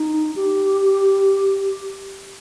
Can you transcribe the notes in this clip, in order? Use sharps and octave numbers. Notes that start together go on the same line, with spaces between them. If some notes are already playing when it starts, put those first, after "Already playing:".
Already playing: D#4
G4